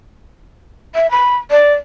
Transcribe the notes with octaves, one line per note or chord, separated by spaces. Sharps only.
E5
B5
D5